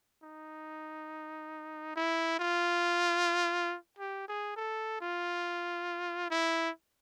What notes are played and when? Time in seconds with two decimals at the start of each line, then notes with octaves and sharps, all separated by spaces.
0.23 D#4
1.96 E4
2.39 F4
3.99 G4
4.28 G#4
4.57 A4
5.01 F4
6.30 E4